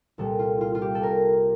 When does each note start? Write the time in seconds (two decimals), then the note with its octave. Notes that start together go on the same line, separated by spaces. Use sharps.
0.18 C2 A#2 G3 A4
0.39 F4
0.61 F4
0.75 F4
0.82 G4
0.95 A4
1.03 A#4